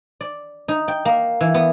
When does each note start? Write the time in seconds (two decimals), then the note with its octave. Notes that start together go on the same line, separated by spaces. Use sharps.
0.21 D5
0.68 D#4
0.88 G5
1.05 A#3
1.41 E3
1.54 B3